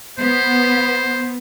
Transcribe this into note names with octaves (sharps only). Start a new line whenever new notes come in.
B3 C5